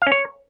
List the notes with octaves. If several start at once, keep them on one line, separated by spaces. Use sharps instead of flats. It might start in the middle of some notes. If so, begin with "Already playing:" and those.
F5
C#4
C#5